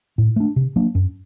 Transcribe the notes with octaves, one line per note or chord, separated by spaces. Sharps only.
A2
A3 D4
C3
F#3 A#3 D4
F#2